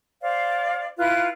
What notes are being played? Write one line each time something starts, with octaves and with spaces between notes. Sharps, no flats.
C5 D5 F5
E4 F4 B4 F#6